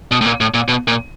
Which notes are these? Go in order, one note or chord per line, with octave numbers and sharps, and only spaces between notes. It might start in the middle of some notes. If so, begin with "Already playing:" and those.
B2
A2
A#2
A2
A#2
B2
A#2